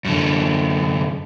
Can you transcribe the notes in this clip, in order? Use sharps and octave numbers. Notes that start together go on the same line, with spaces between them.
F#2 D3